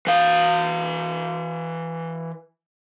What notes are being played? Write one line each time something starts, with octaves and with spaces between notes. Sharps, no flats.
E3 F5